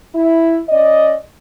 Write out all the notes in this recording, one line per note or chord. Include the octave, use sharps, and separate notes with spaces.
E4
C#4 D5 D#5